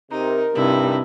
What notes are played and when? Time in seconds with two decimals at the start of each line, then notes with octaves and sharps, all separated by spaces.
0.11 C3 D#4 A#4
0.55 G2 C3 D#4 E4